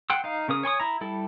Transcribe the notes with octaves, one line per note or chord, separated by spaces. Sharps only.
F#5 G5 C6 E6
D#4 F5
C#3 C#4 A#4 D#6
C#5 G#5 C6 D#6
E4 A#5
G3 E4 A4